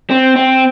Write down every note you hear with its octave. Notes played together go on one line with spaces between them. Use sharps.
C4
C4